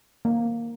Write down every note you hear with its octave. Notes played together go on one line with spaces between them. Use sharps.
A#3